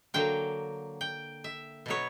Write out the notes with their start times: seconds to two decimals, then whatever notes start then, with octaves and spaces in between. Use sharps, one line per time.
0.14 D3 F#3 A#3 G5
1.01 G5
1.44 E5
1.86 B2 F#3 B3 C#5